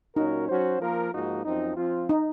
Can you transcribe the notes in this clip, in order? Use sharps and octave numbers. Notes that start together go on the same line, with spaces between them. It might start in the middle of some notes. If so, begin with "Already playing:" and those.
A#2 F#3 C#4 D#4 F#4 A#4
F#3 C#4 F#4 C5
F3 A#3 F4 A#4
G#2 F3 A#3 D#4 F#4
F#2 F3 C4 D#4
F3 C4 F4
D#4